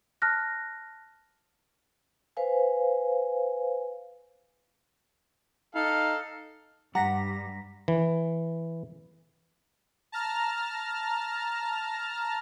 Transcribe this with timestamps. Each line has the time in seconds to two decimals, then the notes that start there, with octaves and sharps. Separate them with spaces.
0.22 A5 F6 F#6 A#6
2.37 B4 C5 F5 G#5
5.75 D#4 A4 F5
6.95 G2 G3 F#5 A#5 A#6 B6
7.88 E3
10.12 A5 A#5 F6